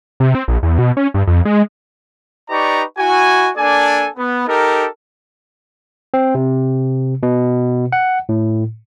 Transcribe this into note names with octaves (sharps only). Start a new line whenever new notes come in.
C3
C4
A#1
E2
B2
C#4
G2
F2
G#3
D#4 G4 B4 D5 A#5 C#6
E4 F#4 G#5
A#3 D4 A4 D5 G#5
B3
D#4 G4 A4 A#4
C4
C3
B2
F#5
A2